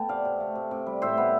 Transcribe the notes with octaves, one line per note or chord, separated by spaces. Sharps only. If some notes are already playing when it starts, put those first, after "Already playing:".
Already playing: A3 B3 G5 A5
C3 D5 F5
C3
A3
C3
C3
G3
A2 C5 E5
B3